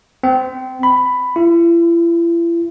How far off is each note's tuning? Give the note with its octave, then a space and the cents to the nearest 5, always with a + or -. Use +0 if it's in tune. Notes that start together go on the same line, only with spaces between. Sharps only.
C4 -20
B5 +10
E4 +40